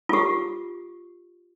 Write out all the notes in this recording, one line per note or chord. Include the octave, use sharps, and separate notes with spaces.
F4 G4